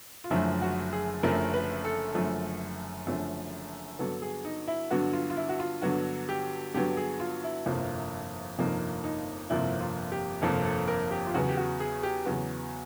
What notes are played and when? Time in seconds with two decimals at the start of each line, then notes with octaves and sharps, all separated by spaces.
0.24 F4
0.30 F#1 F#2 D3 F3 A3 E4
0.62 F#4
0.93 G#4
1.23 F#1 F#2 D3 F3 A3 A#4
1.54 B4
1.85 A4
2.14 F#1 F#2 D3 F3 A3
3.07 F#1 F#2 D3 F3 A3
3.99 G2 D3 F#3 B3 A4
4.22 G#4
4.45 D#4
4.68 E4
4.91 G2 D3 F#3 B3 F#4
5.13 F4
5.30 F4
5.37 E4
5.49 F#4
5.60 F4
5.82 G2 D3 F#3 B3 F#4
6.29 G4
6.74 G2 D3 F#3 B3 G4
6.97 G#4
7.20 F4
7.44 E4
7.66 G1 F2 C3 F3 A#3
8.58 G1 F2 C3 F3 A#3 D#4
9.04 D#4
9.50 G1 F2 C3 F3 A#3 E4
9.80 F4
10.12 G4
10.42 G1 F2 C3 F3 A#3 A4
10.65 A4
10.88 A#4
11.11 G4
11.27 F4
11.34 E2 C#3 F#3 B3 F#4
11.49 G4
11.57 F#4
11.80 G#4
12.03 G4
12.25 E2 C#3 F#3 B3 F#4